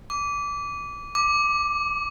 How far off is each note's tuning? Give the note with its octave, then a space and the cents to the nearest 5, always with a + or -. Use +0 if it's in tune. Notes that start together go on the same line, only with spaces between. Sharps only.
D6 -25
D6 +5